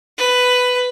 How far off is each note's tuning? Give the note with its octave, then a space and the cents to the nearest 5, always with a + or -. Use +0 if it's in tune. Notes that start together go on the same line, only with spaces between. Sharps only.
B4 +10